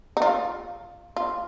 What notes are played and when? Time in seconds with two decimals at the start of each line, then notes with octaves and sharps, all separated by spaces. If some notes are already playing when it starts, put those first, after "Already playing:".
0.17 D#4
0.22 F4
1.17 F4